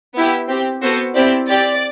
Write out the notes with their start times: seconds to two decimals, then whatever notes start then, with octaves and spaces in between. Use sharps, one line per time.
0.14 B3 E4 G4
0.48 C4 G4
0.82 B3 F#4 A4 C5
1.15 C4 E4 G4 D5
1.48 C4 G4 D5